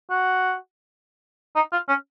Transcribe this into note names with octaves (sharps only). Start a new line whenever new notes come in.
F#4
D#4
F4
C#4